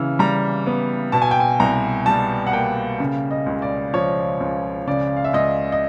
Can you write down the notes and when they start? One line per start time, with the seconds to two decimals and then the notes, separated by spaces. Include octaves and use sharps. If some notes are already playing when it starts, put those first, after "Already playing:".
Already playing: C#3 E3 E6 F6
0.19 G3 A#5
0.67 B3
1.12 B2 A5
1.22 G#5
1.31 G5
1.40 G#5
1.60 C2 A#5
2.06 G3 A5
2.47 F#5
2.53 A#3 G5
3.00 C#3
3.31 D#5
3.46 C#2
3.62 D5
3.94 F3 C#5
4.40 C#2
4.87 C#3 D5
5.16 F5
5.24 E5
5.33 C#2 D#5
5.72 D#5